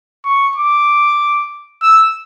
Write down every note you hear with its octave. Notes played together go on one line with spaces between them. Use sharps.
C#6
D6
E6